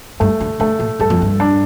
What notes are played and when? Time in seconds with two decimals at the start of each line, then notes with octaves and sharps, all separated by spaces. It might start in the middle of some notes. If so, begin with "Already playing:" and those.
0.20 G2 A3
0.40 D3
0.60 D3 A3
0.80 A2
0.99 G2 A4
1.10 F2
1.22 G2
1.40 D4